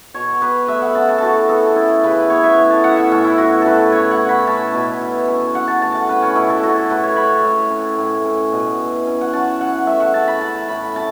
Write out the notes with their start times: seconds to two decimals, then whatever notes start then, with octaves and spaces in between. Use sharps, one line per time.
0.14 B2 C#5
0.41 B3 B4
0.68 A3 E5
0.82 F#5
0.95 C#4 A5
1.08 A5
1.18 E3 F#4 A4
1.49 B3 A4
1.76 C#4 E4
2.04 C#3 B4
2.30 B3 C#5
2.44 E5
2.57 A2
2.70 A5
2.84 C#4 F#5
2.97 E5
3.12 A2 C#4
3.24 E4
3.38 E3 F#4
3.62 C#4 A4 B4
3.92 A3 C#5
4.11 F#5
4.19 C#4
4.29 B5
4.47 C#4 A5
4.74 B2
5.01 E3
5.28 C#4
5.55 C#4 F#5
5.68 A5
5.82 A2 A5
5.95 F#5
6.09 C#4 B4
6.22 C#4
6.35 B2 E4
6.50 A4
6.63 C#4 F#4
6.77 A4
6.90 A2 B4
7.03 C#5
7.16 C#4 B5
7.45 A2
7.70 C#4
7.98 A2
8.25 C#4
8.52 B2
8.79 E3
9.07 C#4
9.21 F#5
9.33 C#4 A5
9.61 E3 F#5
9.87 A3 E5
10.00 F#5
10.14 C#4 A5
10.28 B5
10.41 C#4 A5
10.69 A2 B5
10.96 C#4 A5